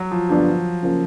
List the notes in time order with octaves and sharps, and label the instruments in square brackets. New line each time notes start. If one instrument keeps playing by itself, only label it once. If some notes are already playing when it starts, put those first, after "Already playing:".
Already playing: [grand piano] F#3
F3
[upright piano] G2 D3 G3 B3 D4 [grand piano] F3
[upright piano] C#3 F3 A#3 C#4